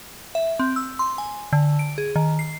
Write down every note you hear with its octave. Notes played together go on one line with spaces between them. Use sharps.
E5
C4
E6
C6
G#5
D3
D7
G#4
D#3
C7